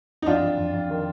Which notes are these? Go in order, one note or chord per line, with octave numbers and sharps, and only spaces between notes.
D#4
F2 D4 F4
F2
F2
F2
D#3